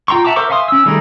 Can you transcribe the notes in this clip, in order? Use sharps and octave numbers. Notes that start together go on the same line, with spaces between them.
F4 G5 A#5 C6 C#6
F#4 E5 A5 A#5 D6
A#4 C5 E5 C#6 D6
E5 F5 G#5 C6 D#6
C#4 E6
D#3 G3 A3 G#4 A#4